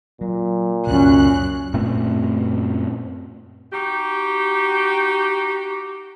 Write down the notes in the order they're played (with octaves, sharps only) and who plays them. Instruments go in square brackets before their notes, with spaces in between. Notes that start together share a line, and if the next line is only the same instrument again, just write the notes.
[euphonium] A#2 [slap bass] F#3
[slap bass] C#2 B2 [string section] F#2 F#6 [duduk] C#4
[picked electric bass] F#2 A#2 A3 C4
[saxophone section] D#4 F#4 G4